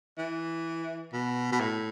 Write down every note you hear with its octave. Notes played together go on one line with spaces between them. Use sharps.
E3
B2
B2
A2